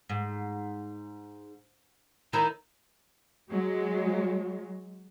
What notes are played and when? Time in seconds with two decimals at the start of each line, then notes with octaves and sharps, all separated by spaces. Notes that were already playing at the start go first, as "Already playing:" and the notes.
0.10 G#2
2.33 D#3 E4 A#5
3.51 F#3 G#3